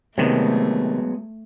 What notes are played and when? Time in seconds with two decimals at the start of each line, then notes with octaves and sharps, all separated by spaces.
0.18 C3 D#3 F#3 G#3 A3 B3